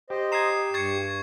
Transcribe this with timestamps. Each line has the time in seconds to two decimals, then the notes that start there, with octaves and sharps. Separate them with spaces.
0.10 G4 C5 D#5
0.32 A#5 D#6 G#6 C7 E7
0.74 G2 C#6 G#6 A6 C7 C#7